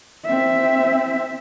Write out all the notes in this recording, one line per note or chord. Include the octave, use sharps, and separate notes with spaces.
C4 E5